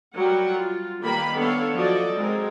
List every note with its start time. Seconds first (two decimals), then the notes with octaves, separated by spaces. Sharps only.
0.17 F#3 G3 A#4 F#5 G5
0.51 F4
1.01 D#3 G3 A#3 G4 B4 B5
1.37 B3 D4 A4 C#5 F5
1.75 F3 F#3 F#4 A4 D5 D#5
2.14 F#3 G#3 C4 D#4 A#4